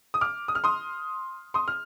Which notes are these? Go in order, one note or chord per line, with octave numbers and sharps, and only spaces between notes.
D#6
D6 F6
D#6
F6
C6 D#6
C6 D#6
F6